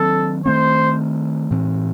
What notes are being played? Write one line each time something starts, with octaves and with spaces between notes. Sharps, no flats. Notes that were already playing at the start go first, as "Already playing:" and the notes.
Already playing: D#3 F#3 C4 A4
D#3 A3 C4 C5
A2 E3 C4